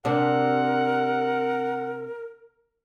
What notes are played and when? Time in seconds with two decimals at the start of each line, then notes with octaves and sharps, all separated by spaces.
0.05 C3 D4 A#4 F#5